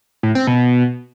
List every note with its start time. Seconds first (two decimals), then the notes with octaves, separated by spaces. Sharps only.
0.23 A2
0.35 C4
0.47 B2